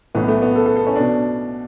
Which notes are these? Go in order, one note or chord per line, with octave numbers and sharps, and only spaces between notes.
B1 A2 E3 B3
A3
B3
A4
A4
A4
C#4
B2 D4